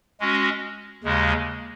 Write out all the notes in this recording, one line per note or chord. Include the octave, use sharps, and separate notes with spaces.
G#3 C#4 F#4
D#2 C#3 G#3